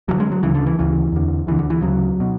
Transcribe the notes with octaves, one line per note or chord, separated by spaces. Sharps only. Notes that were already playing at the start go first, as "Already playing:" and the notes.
D2 D3 F#3
G#3
F#3
D2 C#3 E3
D3
E3
D2 C#3 E3
E2 D3
D2 D3 E3
D3
E3
D2 C#3 F#3
B2